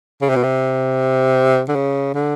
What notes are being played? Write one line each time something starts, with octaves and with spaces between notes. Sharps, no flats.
C#3
C3
B2
C3
D3
C#3
D3